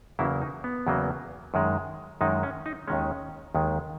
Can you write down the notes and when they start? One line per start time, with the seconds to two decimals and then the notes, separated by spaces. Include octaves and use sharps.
0.19 E2 C#3 F#3 A#3 E4
0.42 D#4
0.64 B3
0.87 E2 C#3 F#3 A#3
1.54 F#2 D#3 G#3
2.21 F#2 D#3 G#3 D#4
2.43 C#4
2.66 D#4
2.88 D#2 D#3 G#3 C#4
3.55 D#2 D#3 G#3